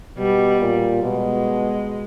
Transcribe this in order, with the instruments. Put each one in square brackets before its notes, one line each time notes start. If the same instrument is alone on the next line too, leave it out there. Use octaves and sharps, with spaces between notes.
[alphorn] B2 [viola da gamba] G3
[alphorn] A#2
[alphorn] B2 [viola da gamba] G#3